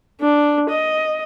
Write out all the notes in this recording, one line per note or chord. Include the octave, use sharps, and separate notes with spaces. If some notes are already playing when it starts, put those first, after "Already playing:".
D4
D#5